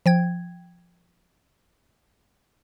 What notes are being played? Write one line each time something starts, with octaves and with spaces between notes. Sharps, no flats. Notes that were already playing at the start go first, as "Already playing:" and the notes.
F3 G5 G#6